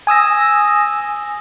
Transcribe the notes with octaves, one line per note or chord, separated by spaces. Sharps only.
G#5 D#6 E6 A#6